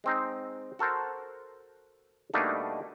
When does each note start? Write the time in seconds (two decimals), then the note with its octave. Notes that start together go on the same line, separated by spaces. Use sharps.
0.04 G#3 C4 D#4
0.79 F#4 A4 A#4 C5
2.34 B2 G3 A3 A#3 D4 D#4